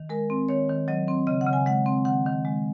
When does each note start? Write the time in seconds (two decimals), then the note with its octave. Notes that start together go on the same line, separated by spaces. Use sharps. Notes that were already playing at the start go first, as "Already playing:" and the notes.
Already playing: D#3
0.09 G#3 A#4
0.30 C4
0.49 D#3 C#5
0.69 D#3
0.88 F#3 D#5
1.08 C4
1.27 C#3 D#5
1.41 F#5
1.47 C#3
1.53 G#5
1.66 G#3 F#5
1.86 C4
2.05 D#3 F#5
2.26 D#3
2.45 G#3